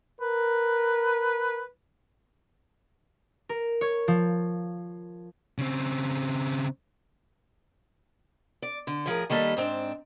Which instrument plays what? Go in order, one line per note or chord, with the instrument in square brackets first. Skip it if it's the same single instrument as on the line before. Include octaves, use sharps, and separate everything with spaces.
[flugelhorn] A#4 [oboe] B4
[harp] A#4
C#5
F3
[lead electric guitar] C#3 C4
[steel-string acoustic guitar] D5
D3
A2 F3 G#4 A#4
D#3 G3 A#3 A4 B4
G#2 C4 D4